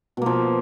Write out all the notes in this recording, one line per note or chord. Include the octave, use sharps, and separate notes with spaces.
B2 F3 A#3